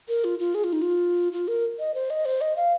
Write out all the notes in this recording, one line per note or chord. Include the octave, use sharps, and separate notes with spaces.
A#4
F4
F4
G#4
F4
D#4
F4
F4
A#4
D#5
C5
D#5
C5
D#5
F5